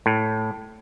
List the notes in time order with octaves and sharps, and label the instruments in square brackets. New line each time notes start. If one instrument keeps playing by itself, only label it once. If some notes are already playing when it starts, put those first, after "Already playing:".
[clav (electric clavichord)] A2